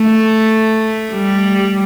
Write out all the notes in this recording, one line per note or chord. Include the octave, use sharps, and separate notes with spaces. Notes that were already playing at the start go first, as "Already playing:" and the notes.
Already playing: A3
G3